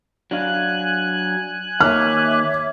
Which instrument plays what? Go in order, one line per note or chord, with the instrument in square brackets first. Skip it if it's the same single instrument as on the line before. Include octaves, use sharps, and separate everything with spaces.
[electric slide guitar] F#3 D4 F5 [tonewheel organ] G#5 F#6
[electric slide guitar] D#3 A#3 [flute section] C#5 E5 D6 [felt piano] F6